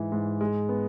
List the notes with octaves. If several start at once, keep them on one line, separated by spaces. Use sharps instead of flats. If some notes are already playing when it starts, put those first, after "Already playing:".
Already playing: G#2 E3
G#2
G#3
B3